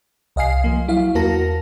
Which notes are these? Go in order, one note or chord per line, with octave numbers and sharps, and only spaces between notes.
C2 D#5 F5 G#5 C7
F3 A#3
F#3 E4 F5
E2 A#3 F#4 A#4 A5 A#6